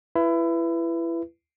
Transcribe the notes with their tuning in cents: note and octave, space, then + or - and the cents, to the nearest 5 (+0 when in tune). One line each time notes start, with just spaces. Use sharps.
E4 +25 B4 +0